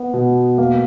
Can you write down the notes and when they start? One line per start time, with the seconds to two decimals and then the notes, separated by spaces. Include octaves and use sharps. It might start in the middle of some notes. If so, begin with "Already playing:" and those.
Already playing: B3
0.14 B2
0.58 A#3